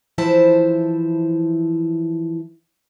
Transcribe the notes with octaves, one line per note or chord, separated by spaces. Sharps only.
E3 F3 E4 C5 A5